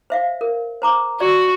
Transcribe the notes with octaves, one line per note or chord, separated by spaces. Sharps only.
C5 E5 F5
A#4
C5 A#5 D6
F#4 D5